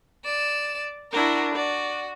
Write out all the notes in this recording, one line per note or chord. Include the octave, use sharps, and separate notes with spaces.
D5 E7
D4 E4 F#4 A#4
F#4 D5